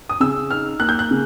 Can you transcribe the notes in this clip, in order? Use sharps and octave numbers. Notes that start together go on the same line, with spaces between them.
D#6
C#3 E6
D#4 F6
A#3 F#6
G6
F#6
C#3